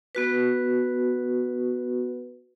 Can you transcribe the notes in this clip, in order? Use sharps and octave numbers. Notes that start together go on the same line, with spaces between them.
B3 F#4 B4